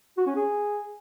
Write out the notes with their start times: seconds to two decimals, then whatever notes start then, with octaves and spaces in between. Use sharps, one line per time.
0.18 F#4
0.27 C#4
0.36 G#4